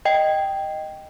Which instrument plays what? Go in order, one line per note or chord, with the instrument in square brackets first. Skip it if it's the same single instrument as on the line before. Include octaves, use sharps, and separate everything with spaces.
[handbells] D#5 G5